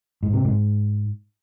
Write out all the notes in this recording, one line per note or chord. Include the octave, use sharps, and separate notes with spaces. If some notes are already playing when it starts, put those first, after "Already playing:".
G#2
C3
G#2